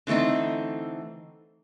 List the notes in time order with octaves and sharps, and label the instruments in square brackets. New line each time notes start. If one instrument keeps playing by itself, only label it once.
[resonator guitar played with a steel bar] D3 E3 A3 C4 D#4